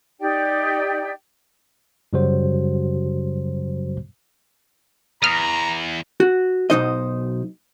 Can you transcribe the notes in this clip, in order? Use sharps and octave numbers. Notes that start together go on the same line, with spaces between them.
D#4 G4 D5 G5
F#2 C#3 F#3 G3 F#4 C5
E2 A#5 D#6 F6
F#4
B1 G#2 B2 D#4 C5 D#5